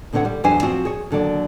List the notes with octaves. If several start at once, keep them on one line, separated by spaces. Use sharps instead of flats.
E2 D3 B3 C4 C#5 F#5
G3
E2 F#3 G3 D4 C5 G#5
F3 C4 F#4
G#4 C#5
D#2 D3 F#3 D5